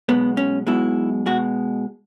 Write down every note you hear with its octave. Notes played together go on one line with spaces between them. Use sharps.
B1 B2 G#3 B3
C#4
B1 B2 G#3 E4
B2 G#3 F#4